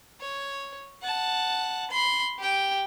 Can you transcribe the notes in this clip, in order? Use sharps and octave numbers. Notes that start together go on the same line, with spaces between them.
C#5
F#5 A5
B5 C6
G4 G5